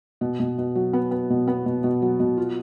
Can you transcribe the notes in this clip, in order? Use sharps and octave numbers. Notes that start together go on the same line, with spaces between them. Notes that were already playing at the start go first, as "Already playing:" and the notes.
B2
B2
B2
F#3
B3
B3
B2
B3
B2
B2
F#3
B2
F4